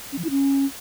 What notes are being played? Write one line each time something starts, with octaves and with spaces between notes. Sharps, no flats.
C#4
F3
E4
C#4